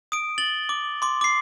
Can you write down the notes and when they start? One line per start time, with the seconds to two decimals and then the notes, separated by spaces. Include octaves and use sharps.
0.12 D#6 D7
0.38 A6 F#7 G7
0.69 D6
1.02 C6 D6
1.21 D6 C7